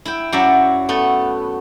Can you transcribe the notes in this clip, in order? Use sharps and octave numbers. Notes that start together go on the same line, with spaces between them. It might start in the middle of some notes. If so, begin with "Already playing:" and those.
E4 G5
F#2 F#3 E4 F#4 D5 E5
A3 B3 A4